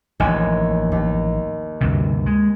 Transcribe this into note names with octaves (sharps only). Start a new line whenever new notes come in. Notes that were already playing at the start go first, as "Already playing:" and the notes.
A1 D#2 F3 G#5
D#2
D2 G2 C3
G#3